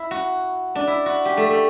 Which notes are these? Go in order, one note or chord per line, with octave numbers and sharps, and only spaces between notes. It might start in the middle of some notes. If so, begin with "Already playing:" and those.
Already playing: E4
F#4
D4
E4
F#4
G4
A3
A3